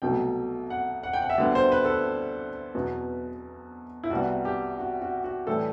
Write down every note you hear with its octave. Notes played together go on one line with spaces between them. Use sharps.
C2 B2 F#3 A3 G5
F#5
F#5
G5
F#5
E5
D2 D3 G3 B3 D5
C5
B4
A4
B4
E2 B2 F#3 B3
E4
C2 C3 G3 B3 F#4
G4
F#4
F#4
F#4
A2 E3 G3 A4